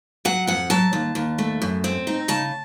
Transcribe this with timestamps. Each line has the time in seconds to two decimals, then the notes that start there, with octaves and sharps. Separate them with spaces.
0.25 F#3 F#5
0.47 F2 F#5
0.70 F#3 A5
0.93 D#2
1.15 D#2
1.38 A3
1.62 F#2
1.84 C4
2.07 D#4
2.28 C#3 A5